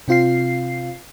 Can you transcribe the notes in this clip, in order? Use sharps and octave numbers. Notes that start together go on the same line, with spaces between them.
C3 C4 F4 F5 C7